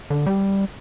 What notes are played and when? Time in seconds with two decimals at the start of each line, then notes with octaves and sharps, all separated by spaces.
0.10 D3
0.26 G3